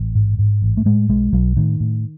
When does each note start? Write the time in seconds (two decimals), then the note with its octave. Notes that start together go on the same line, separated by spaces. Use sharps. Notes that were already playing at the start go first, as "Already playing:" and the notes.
Already playing: A1
0.15 G#2
0.39 G#2
0.62 A1
0.77 A3
0.85 A2 G#3
1.09 B1 G#3
1.33 B1 F#3
1.57 A2 D#3
1.80 A2